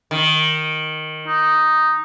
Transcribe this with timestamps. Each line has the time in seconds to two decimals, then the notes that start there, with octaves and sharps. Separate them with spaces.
0.11 D#3
1.27 D#4